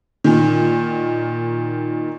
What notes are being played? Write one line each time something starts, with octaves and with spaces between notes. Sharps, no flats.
A#2 D#3